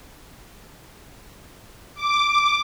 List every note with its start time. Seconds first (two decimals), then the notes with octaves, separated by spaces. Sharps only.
1.95 D6